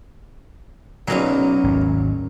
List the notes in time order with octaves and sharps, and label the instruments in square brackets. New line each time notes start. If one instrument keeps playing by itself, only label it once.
[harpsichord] B1 A#2 [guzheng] F#3 A#3 C#4
[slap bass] G#1 D#2